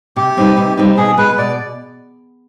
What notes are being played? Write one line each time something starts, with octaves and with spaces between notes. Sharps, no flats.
C3 G4
G3 C4 D#4 B4
C3
G3 C4 D#4 B4
B2 G#4
G#3 B3 B4
B2 D5